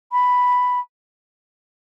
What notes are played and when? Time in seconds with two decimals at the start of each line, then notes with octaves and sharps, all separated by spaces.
0.12 B5